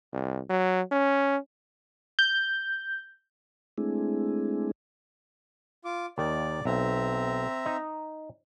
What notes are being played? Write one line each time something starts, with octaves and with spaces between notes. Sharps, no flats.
C2
F#3
C#4
G6
G#3 A3 C4 D4 E4 G#4
F4 D6
D#2 D#3 D5
B1 C4 E5 A#5
D#4